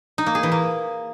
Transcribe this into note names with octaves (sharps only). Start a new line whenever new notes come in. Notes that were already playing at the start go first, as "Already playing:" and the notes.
D#4
A#3
G#4
E3
A#3